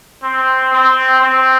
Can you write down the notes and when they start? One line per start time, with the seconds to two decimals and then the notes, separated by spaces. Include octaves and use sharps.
0.23 C4
0.72 C4
1.22 C4